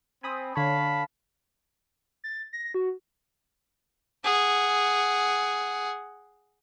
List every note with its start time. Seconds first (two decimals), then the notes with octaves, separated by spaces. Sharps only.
0.23 C4 G#5 B5 D#6
0.56 D3 C#5 F5 A5 B5
2.24 A6
2.53 A#6
2.74 F#4
4.25 G#4 F#5